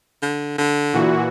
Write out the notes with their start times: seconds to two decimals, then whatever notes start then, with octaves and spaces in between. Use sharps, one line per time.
0.23 D3
0.58 D3
0.93 A#2 E3 F#4